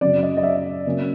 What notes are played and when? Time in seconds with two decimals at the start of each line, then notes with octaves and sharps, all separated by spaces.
0.01 F#2 C#3 F#3 D5
0.23 D#5
0.37 D#5
0.43 E5
0.86 C#3 F#3 A#3 C#4